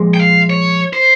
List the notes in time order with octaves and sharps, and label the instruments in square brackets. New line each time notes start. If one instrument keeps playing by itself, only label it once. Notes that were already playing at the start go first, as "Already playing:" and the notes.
Already playing: [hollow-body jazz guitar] A#2 F3 G#3
[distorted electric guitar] G5
F5
C#5
C5